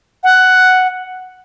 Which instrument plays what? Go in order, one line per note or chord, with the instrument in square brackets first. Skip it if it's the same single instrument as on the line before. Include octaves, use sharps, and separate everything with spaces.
[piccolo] F#5